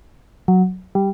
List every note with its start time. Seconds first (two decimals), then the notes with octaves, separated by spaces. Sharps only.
0.48 F#3
0.95 G3